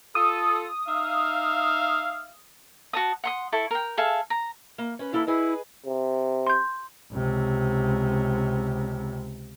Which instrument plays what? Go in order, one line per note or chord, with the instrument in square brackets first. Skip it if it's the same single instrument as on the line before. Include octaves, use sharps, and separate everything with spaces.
[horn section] F4 A4 [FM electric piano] D#6
[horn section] D#4 E5 F5
[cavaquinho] F#4 A5 D#6
F#5 C6 D#6
E4 A4 C#6
A#4 G5
G#4 A4 E5 F5
A#5
[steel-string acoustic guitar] A#3
C#4 B4
[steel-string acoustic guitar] E3 A#3 A4 [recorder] E4
[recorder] E4 [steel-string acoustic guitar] G#4 B4 D#5
[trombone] C3
[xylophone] C6 G6
[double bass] C#2 C3